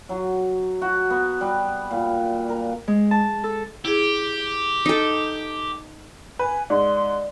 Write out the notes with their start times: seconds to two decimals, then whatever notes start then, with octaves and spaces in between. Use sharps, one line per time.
0.09 F#3
0.82 F#4
1.10 B3
1.41 G3
1.91 A#2
2.49 A#4
2.88 G#3
3.11 A5
3.44 A4
3.85 E4 G4 G#4
4.86 D#4 A4
6.39 B4 G#5
6.70 G#2 D5 C6